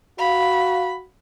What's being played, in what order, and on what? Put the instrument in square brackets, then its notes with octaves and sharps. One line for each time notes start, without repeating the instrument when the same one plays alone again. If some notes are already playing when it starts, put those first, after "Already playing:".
[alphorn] F#4 [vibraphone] F5 [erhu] B5